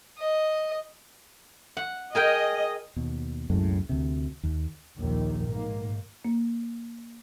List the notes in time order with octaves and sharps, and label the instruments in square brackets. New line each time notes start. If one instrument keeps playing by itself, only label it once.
[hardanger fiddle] D#5
[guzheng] F#5
[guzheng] G#4 A#4 G5 [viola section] D#5
[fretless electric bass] D#2 B2
C2 F#2 A2 G#3
D2 C3
D#2
[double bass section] A#1 D#2 D#3
G#2 A#3
[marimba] A#3